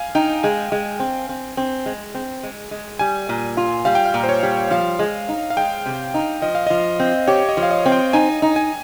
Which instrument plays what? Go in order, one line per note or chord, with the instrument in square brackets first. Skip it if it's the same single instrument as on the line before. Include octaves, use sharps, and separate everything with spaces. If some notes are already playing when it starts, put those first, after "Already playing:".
Already playing: [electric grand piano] F5 G#5
[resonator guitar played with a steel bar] D#4 [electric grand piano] G5
[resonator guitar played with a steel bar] G#3 [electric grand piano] G#5
[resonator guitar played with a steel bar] G#3
C4
C4
C4
G#3
C4
G#3
G#3
[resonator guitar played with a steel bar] G3 [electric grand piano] G#5
[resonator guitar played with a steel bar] A#2
F4
[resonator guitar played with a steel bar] G3 [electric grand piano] F5
[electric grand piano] G5
F5
[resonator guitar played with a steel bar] A#2
[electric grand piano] C5
C#5
[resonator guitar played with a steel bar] G3
[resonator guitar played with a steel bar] F3 [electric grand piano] F5
[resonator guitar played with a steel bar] G#3
D#4
[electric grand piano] F5
[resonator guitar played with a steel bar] G#3 [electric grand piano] G5
[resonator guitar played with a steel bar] C3
D#4
[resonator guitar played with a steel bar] F3 [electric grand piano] D#5
[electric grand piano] F5
[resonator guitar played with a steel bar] F3 [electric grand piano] D#5
[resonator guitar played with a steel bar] C4
[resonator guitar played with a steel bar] G4 [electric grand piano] C#5
[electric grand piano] D#5
[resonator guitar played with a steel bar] F3
[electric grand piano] F5
D#5
[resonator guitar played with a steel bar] C4
[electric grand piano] G5
[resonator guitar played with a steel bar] D#4 [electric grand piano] G#5
[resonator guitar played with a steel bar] D#4
[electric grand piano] G#5